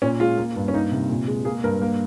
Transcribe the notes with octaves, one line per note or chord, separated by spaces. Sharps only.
A#2 C#4
G#3 F4
A#3
G2
C#4
A#3 D#4
C3
A#2
G#3
A#3 G#4
G2 A#4
A#3